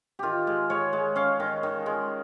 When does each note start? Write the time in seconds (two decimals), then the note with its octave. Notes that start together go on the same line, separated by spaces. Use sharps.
0.19 D#3 F4 G4
0.47 G#3
0.70 G#3 C#5
0.93 G#3
1.16 C#4 F5
1.40 D#3
1.63 D#3
1.86 G#3